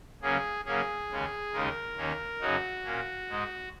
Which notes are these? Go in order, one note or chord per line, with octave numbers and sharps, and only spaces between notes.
C#3 F#3 A#3 C#4 G#4
C#3 F#3 A#3 C#4 G#4
D#2 C#3 G#3 C#4
D#2 C#3 G#3 D#4 A#4
D#2 D#3 A#3 C#4
F#2 C#3 F#3 D#4 F#4
A#2 A#3 C#4
G#2 G#3 D#4